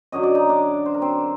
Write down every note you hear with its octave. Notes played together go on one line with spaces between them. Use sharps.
F#2 D3 F#3 D#5
D5
D#4 D#5
D4 D5
C5
A#4
C4 C5